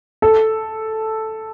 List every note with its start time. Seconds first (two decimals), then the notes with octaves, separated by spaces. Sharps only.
0.22 A4